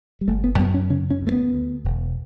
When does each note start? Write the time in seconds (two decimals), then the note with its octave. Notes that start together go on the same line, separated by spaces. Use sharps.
0.21 G3
0.28 G1 A3
0.44 B3
0.59 F#2 B3
0.74 C#4
0.90 C#3 C#4
1.10 C#4
1.21 D2
1.27 A3
1.32 B3
1.53 D2
1.84 E1